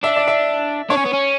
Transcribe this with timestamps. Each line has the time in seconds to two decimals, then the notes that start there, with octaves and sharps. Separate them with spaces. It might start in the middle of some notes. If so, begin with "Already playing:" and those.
0.03 D4 E5
0.16 D5
0.28 E5
0.90 D4 C#5
0.97 C#4
1.05 B3
1.13 C#4